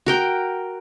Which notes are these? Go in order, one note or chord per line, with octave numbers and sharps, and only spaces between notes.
F#4 A#4 G5